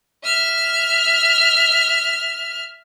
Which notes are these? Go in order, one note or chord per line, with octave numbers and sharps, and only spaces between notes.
E5 F6